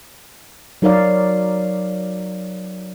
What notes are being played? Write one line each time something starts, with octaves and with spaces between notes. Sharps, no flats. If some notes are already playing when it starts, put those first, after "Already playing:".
F#3 D#4 A#4 C#5 D5 F5